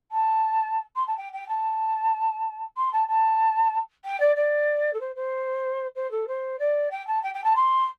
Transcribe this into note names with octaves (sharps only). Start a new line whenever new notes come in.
A5
C6
A5
G5
G5
A5
C6
A5
A5
G5
D5
D5
A4
C5
C5
C5
A4
C5
D5
G5
A5
G5
G5
A5
C6